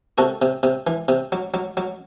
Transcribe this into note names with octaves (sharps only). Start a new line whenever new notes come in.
C3 F#4 A4
C3
C3
E3
C3
F#3
F#3
F#3